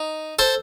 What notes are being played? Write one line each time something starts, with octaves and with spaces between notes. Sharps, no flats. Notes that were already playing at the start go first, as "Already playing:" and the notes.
Already playing: D#4
A4 C5